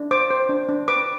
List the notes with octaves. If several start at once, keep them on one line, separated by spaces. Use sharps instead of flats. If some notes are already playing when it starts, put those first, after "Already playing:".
Already playing: D4
C5 D6
C5
D4
D4
B4 D6